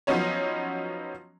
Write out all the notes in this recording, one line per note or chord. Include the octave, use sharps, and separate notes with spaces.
F3 F#3 B3 C#4 D#4 C#5